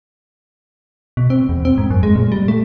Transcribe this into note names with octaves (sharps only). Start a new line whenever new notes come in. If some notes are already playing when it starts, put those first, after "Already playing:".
B2
C4
E2
C4
G#2
F#2
G#3
A#2
G3
A3